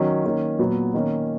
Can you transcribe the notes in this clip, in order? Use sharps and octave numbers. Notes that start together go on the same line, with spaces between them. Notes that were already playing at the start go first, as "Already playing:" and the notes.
Already playing: D#3 F#3 C#4
D#3 A#3 C#4
A#2 F#3 B3
D#3 A#3 C#4